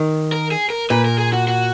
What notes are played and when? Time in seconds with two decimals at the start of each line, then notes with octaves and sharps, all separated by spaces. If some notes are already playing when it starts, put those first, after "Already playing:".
Already playing: D#3
0.32 A#4
0.51 G#4
0.70 A#4
0.90 A#2 B4
1.05 A#4
1.18 G#4
1.33 F#4
1.48 F#4